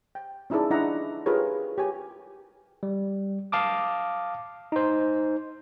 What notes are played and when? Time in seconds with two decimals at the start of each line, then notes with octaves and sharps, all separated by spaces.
0.15 G5
0.50 C#4 D#4 E4 G#4 A4 D5
0.71 D4 E4 D#5 F#5 A#5
1.26 F4 G4 G#4 A#4 B4 C#5
1.78 G4 C#5 G#5
2.83 G3
3.52 F5 A5 D6 D#6
4.72 D#4 C5